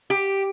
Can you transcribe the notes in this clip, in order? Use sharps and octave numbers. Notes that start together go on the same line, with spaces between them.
G4